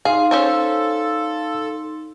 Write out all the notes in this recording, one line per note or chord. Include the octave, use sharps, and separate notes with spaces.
D#4 G#4 F5 C6
C#4 A4 C5 C#5